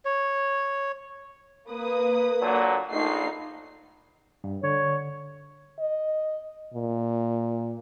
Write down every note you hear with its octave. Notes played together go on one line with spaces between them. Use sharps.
C#5
A#3 B4 D#6
A#2 D3 F#3
A#1 A3 D#4 C7
G2
D3 C#5
D#5
A#2